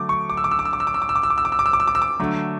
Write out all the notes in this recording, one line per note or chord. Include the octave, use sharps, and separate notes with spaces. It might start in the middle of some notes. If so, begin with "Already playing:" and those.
Already playing: D3 F#3 A3 D6
C#6
D6
E6
D6
E6
D6
E6
D6
E6
D6
E6
D6
E6
D6
E6
D6
E6
D6
E6
D6
E6
D6
E6
D6
E6
D6
D3 F#3 A3